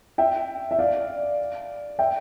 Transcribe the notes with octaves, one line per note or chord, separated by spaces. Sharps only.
E5 G5
E5
D5 F5
E5 G5